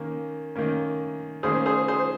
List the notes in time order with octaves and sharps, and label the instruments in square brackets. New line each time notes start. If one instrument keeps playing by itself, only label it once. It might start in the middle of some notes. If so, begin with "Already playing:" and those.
Already playing: [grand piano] D#3 A#3 C#4
D#3 A#3 C#4
[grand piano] D#3 A#3 C#4 [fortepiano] G#4 C5
[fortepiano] G#4 C5
G#4 C5